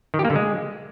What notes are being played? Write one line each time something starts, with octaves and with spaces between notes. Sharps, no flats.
D#3
G4
A#3
D3
G#3